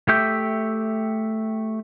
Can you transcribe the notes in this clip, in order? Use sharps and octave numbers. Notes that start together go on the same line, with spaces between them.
A3 G4 E5 G5